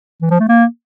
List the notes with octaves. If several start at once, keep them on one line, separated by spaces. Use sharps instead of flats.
E3
F3
A3
A#3